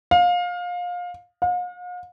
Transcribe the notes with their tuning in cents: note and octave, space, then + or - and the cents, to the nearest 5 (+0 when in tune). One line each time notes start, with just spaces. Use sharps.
F5 +25
F5 +45